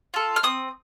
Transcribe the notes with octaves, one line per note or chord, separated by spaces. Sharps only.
F4 A4
F6
C4 D#6